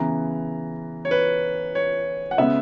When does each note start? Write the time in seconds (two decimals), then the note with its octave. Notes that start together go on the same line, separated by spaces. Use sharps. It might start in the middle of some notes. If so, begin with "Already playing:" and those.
Already playing: C#3 E3 B3 A#5
1.05 C#5
1.11 B4
1.75 C#5
2.31 F#5
2.38 C#3 G#3 B3 E5